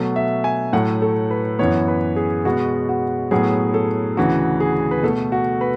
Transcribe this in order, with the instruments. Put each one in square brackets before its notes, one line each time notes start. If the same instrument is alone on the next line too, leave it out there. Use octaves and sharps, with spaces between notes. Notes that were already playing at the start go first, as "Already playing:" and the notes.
Already playing: [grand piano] B2 F#3 A3
E5
G#5
A2 F#3 A3 F#5
A4
B4
F#2 E3 B3 C#5
B4
G#4
B2 G#3 B3 F#4
F#4
A2 F#3 B3 G#4
A4
D2 C#3 E3 F#4
G#4
B4
B2 A3 A4
F#4
B4